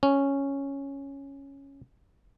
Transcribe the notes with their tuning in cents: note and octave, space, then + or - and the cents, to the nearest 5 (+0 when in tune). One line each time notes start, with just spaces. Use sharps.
C#4 -5